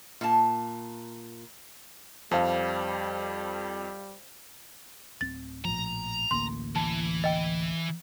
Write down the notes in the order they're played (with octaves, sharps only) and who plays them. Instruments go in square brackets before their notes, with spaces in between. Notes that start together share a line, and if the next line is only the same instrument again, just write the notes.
[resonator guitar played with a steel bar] A#2 A5
[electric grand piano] F2 [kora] F3 E5 [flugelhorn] G3 [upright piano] F5 A5
[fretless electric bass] D1 C4 [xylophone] A6
[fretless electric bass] A#1 A2 F3 [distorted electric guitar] A#5
[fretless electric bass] A1 D2 A#3 [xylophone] C6
[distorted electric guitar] E3 [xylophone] A5
[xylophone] D#5 G5